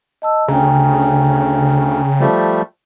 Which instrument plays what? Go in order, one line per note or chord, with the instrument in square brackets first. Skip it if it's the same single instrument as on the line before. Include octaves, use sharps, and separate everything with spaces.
[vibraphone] D#5 A5 E6
[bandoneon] D2 [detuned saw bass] C#3 [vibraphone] G5 G#5 A#5
[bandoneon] F3 G3 A3